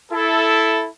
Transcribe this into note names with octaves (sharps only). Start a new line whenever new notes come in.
E4 A4